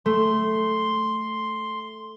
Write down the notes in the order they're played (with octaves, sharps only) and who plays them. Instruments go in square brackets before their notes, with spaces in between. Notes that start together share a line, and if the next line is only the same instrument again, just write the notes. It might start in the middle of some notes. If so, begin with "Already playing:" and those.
[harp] A3 [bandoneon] C6